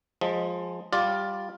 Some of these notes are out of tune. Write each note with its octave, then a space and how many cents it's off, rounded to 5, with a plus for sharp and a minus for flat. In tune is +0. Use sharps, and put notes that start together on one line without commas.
F3 +20 G#3 +0
G3 +0 F4 +10 D5 +0